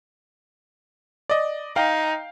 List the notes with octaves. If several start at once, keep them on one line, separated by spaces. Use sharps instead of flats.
D5 D#5
D#4 F5 G5